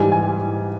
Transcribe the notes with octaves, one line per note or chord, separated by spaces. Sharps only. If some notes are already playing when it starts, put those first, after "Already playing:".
Already playing: G#2 E3 G3 G#5
G#5